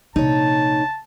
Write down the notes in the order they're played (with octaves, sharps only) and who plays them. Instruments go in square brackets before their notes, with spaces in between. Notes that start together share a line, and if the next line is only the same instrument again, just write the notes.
[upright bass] A#1 C3 [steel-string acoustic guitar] D#4 C#5 [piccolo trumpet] A5